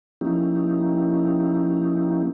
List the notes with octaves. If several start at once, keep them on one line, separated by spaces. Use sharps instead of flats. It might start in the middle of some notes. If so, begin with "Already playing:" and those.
F3 A#3 C#4 D#4 E4 G4